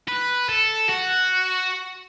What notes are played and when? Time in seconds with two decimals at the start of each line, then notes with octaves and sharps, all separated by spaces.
0.08 B4
0.49 A4
0.89 F#4